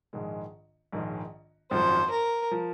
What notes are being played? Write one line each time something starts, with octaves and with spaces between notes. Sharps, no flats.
A#1 G#2 D#3 G#3
A#1 G#2 D#3 G#3
G#1 F#2 F3 C5
A#4
F3